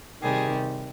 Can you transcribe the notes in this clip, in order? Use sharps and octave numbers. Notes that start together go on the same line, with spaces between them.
C3 D#3 G3 G#4